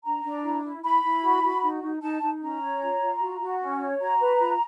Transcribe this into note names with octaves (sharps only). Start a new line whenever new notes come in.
D4 A#5
D4
E4
E4
E4 B5
E4
F#4
F#4
D#4
D#4
D#4 A5
D#4
C#4 A#5
C#5
F4
F4
F#4
F#4
C#4
C#5
F#4 A#5
B4
F4